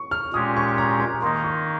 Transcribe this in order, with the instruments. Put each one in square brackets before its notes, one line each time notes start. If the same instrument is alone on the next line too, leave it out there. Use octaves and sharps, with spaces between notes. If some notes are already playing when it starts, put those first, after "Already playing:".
Already playing: [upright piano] C#6
F6
[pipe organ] A#2 G#3 C#4 G4 [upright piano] D#6
[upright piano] C#6
A#5
A#5
[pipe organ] D#3 A#3 D#4 [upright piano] C6
[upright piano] C#6